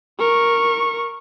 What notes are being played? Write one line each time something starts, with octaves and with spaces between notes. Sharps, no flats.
A#4 C#6